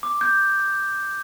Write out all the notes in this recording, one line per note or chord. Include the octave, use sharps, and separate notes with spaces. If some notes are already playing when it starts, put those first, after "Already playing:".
D6
G6